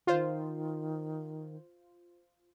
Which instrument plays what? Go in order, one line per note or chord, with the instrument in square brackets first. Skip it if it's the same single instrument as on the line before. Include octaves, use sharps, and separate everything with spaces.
[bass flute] D#3 [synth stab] F4 C5